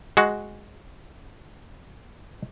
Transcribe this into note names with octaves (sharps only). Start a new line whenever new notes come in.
G#3 F#4